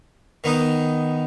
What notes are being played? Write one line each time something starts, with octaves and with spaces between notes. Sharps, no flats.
D#3 B3 D#4